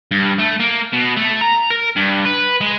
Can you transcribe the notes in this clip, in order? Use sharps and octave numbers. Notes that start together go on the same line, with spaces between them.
G2
A3
A#3
B2
A3
A#5
A#4
G2
B4
G#3